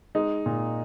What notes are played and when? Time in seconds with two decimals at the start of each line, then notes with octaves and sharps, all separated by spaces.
0.15 G#3 D#4
0.46 A#2